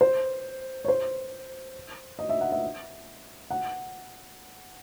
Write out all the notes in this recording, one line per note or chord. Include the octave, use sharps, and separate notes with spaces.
C5
C#5
C5
D#5
E5
F#5
E5
F#5